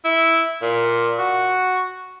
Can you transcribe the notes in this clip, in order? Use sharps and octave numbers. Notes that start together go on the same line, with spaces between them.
E4
A#2
F#4